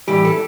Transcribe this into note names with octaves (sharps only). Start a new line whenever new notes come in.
A2 E3 G3 G4
A4